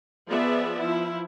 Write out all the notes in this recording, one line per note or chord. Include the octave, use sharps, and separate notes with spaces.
F3 B3 G#4 D5 E5
F3 E4